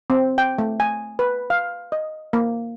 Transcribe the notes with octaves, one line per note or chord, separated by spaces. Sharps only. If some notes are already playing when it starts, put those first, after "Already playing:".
C4
G5
A3
G#5
B4
F5
D#5
A#3